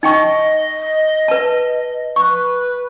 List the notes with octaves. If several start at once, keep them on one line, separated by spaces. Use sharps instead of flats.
D#4 D#5 G5 C#6
B4 A5
B4 C#6